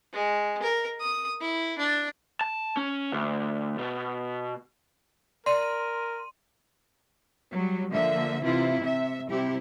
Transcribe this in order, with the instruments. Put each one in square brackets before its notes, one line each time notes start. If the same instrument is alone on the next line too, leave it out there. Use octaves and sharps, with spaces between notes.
[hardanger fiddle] G#3
A#4
D#6
E4
D4
[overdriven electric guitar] A5
C#4
D2
B2
[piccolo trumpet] A#4 [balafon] D5 [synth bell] C6 D#7
[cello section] F#3 G3
D3 F3 A#3 E5
C3 E3 E4 F4
C3 E5
C3 G3 C4 E4 G4